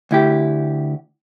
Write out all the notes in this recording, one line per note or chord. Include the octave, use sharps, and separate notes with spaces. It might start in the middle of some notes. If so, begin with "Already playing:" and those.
D2 E4 G4